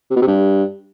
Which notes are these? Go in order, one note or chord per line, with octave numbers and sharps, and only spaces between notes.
C3
B2
C3
G2